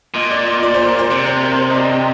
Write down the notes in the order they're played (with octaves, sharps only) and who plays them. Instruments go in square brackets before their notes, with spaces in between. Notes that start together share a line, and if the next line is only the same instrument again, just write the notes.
[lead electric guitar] A#2 [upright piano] D#5
[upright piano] D5
D#5
D5
C5
A#4
C5
[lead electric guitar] C3 [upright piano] D5
[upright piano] C5
A#4
C5
D#5
D5
D#5